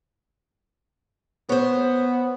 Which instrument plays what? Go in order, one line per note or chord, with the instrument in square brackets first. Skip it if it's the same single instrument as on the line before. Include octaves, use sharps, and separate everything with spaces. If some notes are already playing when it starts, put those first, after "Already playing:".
[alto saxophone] B3 [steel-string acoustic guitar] C5 C#5